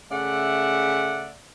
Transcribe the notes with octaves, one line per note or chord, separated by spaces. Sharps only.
C#3 A3 D5 E5 F#5